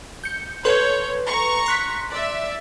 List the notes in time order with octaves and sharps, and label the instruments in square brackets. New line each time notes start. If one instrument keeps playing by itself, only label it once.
[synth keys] G6 C#7
[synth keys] A4 B4 C6 [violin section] C#5 G6
[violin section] A#5 C#6
[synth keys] C6 F#6 B6
[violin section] D5 E5